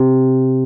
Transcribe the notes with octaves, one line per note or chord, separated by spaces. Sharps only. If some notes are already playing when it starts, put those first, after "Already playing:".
Already playing: C3